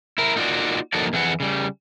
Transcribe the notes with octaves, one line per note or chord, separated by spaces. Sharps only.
E4 A#4
A#3 D#4 F4 F#4 D5
F3 A#3 D#4 F#4 A4 D5
F2 E3 G#4 F#5
C#3 G3